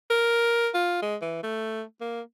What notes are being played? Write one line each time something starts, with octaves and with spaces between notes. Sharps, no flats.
A#4
F4
G#3
E3
A3
A#3